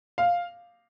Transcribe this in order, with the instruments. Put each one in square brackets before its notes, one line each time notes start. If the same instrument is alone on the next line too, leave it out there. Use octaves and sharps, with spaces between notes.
[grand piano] F5